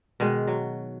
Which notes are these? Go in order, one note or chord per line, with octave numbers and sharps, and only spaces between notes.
B2 D#3 G#3
F#3